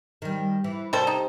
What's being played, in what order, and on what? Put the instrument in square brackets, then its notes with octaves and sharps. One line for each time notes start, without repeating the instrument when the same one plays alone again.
[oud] D#3 G3
E3
[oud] C3 [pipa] G3 A4 C5
[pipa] D#4